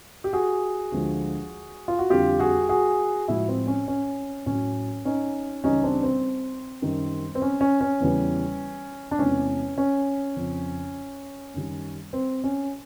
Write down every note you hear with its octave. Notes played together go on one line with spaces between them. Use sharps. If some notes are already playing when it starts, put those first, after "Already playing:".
G4
F#4 G#4
D2 D3 F3 G#3
F4
F#4
F2 D3 G3 F4 G4
F#4 G#4
F#4 G#4
A2 F3 G#3 E4 F#4
C4
C#4
C#4
A2 F#3 C#4
C#4 D#4
C#2 C#3 E3 G3 C#4 D#4
C4 D4
C4
F#2 D#3 G3
C4
C#4
C#4
C#4
E2 C#3 E3 G3
D4
E2 C3 E3 G#3 C#4
C#4
F2 C#3 F3
F#2 D#3 G3
C4
C#4